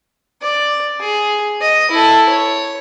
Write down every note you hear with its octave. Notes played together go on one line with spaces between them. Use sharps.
D5
G#4
D#5
E4 A4
C#5